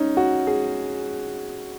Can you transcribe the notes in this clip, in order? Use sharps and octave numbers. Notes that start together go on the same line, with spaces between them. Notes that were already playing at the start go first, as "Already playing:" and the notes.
Already playing: C#4 D#4
F#4
G#4